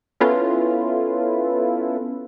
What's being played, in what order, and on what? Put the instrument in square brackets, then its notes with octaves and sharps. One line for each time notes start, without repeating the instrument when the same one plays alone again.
[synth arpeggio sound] B3 C#4 E4 F4 A4 B4